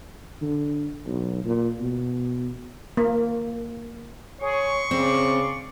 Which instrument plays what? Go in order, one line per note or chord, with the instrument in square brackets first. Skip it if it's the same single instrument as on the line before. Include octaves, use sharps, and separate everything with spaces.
[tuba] D3
B1
A#2
B2
[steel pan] A#3
[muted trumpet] G#4 [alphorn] C#5 [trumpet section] C6 C#6
[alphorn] C#3 [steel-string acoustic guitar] C4 [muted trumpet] D5